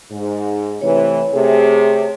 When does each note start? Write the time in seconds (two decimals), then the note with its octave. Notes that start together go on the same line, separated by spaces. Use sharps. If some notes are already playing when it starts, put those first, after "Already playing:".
0.11 G#2
0.82 C3 E3 A3 C#5
1.34 C3 A3 G#4